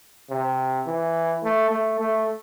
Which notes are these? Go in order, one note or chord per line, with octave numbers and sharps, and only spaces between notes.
C3
E3
A3
A3
A3